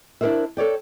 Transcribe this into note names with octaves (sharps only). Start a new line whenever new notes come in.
D4 E4 G4 A#4 C5 E5
A4 C#5 D5 G5